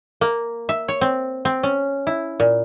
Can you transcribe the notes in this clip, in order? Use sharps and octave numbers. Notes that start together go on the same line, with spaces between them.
A#3
E5
C#5
C4
C4
C#4
E4
A#2